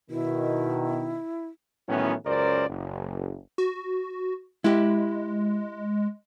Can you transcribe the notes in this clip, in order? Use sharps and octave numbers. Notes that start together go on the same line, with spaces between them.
B2 D#3 E4
A2 D#3 E3 F#3 B3 C#4
C#2 F#2 A#4 C5 D5
F#1
F#4
G#3 E4 G4